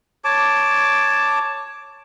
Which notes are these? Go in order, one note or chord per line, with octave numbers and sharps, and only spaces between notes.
C#5 A5 D6